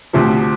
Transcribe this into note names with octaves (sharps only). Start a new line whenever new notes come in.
D2 C3 F3